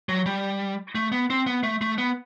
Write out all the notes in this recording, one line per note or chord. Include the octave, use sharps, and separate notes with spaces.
F#3
G3
A3
B3
C4
B3
A3
A3
B3